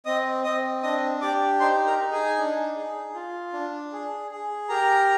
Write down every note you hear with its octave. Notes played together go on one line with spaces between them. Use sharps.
C4 D#5 D#6
C4 D#5 D#6
D4 D#5 D#6
G4 D5 D6
D#4 C5 C6
A#4 A#5
D#4
G#4 G#5
D4
G#4
F4
D4
G#4
G#4
G4 A#4 A#5